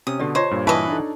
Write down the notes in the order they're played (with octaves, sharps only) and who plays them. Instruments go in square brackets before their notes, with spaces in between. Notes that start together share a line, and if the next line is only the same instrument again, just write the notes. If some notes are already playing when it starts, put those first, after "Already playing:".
[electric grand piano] C3 C#4 [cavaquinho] D#6
[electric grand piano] B2 D3 [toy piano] G4 A4 D5
[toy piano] F4 C#5 C#6 [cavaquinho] C5 [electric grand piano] D#5 A5 G#6
[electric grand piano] G2 A#2
[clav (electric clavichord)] E3 [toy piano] F#4 A5 C#6 [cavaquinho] B4 D#5
[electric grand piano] D4 D#4 A4